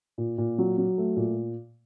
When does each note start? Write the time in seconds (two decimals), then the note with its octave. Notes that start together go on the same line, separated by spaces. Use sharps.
0.18 A#2
0.38 A#2
0.58 F#3
0.78 F#3
0.98 A3
1.17 A#2